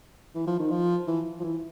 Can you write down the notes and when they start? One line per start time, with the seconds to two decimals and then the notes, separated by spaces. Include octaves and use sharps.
0.35 E3
0.47 F3
0.59 D#3
0.71 F3
1.07 E3
1.40 F3
1.44 E3